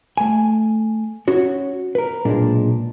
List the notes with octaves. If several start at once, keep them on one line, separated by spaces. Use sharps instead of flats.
A3 G#5
C#4 F#4 C#5
A#4 B4
B1 A#2 G#3 D4